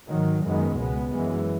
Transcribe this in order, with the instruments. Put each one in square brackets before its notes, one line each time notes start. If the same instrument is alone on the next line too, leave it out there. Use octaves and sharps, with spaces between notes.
[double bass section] G#2 D#3 F#3
F#2 D#3 G#3 B3
C#2 B2 G#3 B3
F#2 E3 G#3